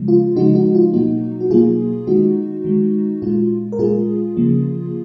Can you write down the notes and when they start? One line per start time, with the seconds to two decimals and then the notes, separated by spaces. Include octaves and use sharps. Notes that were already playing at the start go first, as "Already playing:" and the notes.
Already playing: C#3 F3 G#3
0.08 F4
0.36 C#3 F3 G#3 D#4 F#4
0.55 D#4 F#4
0.75 F4
0.93 B2 F#3 A#3 D#4 F#4
1.41 F#4
1.50 B2 F#3 A#3 F4 G#4
2.07 D#3 G#3 D#4 F#4
2.65 D#3 G#3
3.22 A#2 G#3 F4
3.72 A#4
3.79 A#2 G#3 F4 G#4
4.37 C#3 F3 A#3